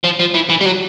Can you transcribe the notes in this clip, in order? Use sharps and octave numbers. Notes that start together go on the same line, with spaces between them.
F3
F3
E3
E3
G3
F#3